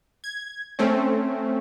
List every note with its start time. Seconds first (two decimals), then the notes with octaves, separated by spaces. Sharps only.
0.24 G#6
0.79 A3 C4 C#4